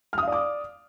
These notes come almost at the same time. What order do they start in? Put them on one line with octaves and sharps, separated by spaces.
F6 D#6 F5 D5 D6